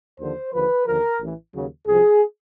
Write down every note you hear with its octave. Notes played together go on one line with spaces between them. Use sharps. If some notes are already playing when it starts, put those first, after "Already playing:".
D#2 D3 F3 C5
D#2 D3 F3 B4
D#2 D3 F3 A#4
A1 A2 E3
D#2 C#3 F#3
C2 C3 F3 G#4